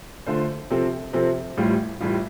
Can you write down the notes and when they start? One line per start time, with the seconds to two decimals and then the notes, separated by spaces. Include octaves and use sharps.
0.27 D3 A3 F4 C5
0.71 C3 F3 C4 A4
1.13 C3 F3 C4 A4
1.57 A1 A2 G3 F4
2.00 A1 A2 G3 F4